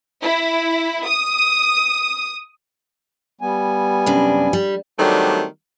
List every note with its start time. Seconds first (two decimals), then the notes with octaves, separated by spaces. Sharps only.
0.22 E4
1.06 D#6
3.41 G3 B3 G#5
4.06 F#2 C3 D4
4.53 G3
4.98 D#3 F#3 G3 A3 C4 D4